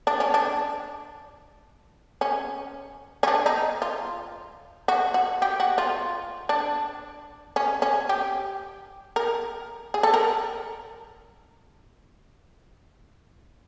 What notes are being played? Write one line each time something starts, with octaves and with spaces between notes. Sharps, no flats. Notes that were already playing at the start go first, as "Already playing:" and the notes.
D4
C#4
D4
C#4
C#4
D4
D#4
F4
F#4
F#4
G4
F#4
F4
D4
C#4
C#4
G4
A#4
G#4
A4
A#4